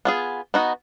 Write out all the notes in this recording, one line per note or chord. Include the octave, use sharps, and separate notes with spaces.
B3 F4 G#4
B3 D#4 F#4